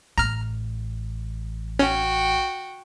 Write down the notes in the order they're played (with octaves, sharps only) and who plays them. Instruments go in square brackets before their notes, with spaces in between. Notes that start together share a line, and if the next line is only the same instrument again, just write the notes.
[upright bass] A1 [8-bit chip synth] A#5 F6
[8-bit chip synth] C#4 [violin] F#4 G5